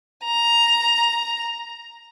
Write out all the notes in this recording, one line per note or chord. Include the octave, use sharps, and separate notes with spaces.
A#5